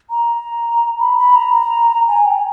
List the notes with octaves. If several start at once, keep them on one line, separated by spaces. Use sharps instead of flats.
A#5
B5
B5
A#5
G#5
G5